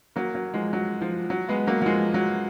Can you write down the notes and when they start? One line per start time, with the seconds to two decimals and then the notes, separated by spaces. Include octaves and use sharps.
0.16 F#3 A#3
0.35 F#3
0.54 F3 G#3
0.73 F#3
1.01 F3
1.30 F#3
1.49 G#3 B3
1.67 F#3 A#3
1.82 F#3
1.86 F3 G#3
2.14 F#3